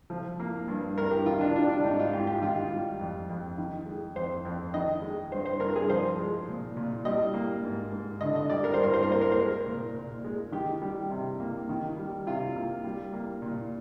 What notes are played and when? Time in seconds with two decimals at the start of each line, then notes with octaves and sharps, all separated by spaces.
0.10 F3
0.40 A#3
0.68 G2
0.97 G2 A#4
1.11 G4
1.26 D#3 F4
1.41 D4
1.56 G3 D4
1.69 D4
1.84 G#2 D#4
1.99 F4
2.13 G#2 G4
2.27 G4
2.42 D#3 F4
2.70 G3
3.00 F2
3.29 F2
3.58 D#3
3.86 G#3
4.16 F2 C5
4.45 F2
4.74 D#3 D#5
5.02 G#3
5.31 G2 C5
5.46 C5
5.60 G2 A#4
5.76 G#4
5.90 F3 C5
6.19 G#3
6.48 A#2
6.77 A#2
7.05 G3 D#5
7.34 A#3
7.63 G#2
7.92 G#2
8.21 D3 D#5
8.36 D#5
8.50 G3 D5
8.64 A#4
8.74 C5
8.79 G2 A#4
8.93 C5
9.03 A#4
9.08 A#3 C5
9.21 A#4
9.32 C5
9.36 G#3 A#4
9.66 A#2
9.95 A#2
10.24 G#3
10.52 D#3 G4
10.82 G3
11.10 C3
11.40 A#3
11.69 D#3
11.97 G3
12.27 C3 F4
12.56 A#3
12.85 G3
13.13 A#3
13.42 A#2